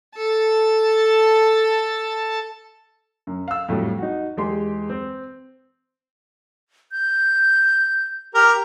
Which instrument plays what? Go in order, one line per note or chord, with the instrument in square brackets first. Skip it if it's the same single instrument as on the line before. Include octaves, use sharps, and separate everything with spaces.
[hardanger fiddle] A4 A5
[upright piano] F#2
F5 E6
F2 A2 F#3 G3
D#4 F#4
E2 G#3 G4 C6
C4
[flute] G6
[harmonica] G4 A#4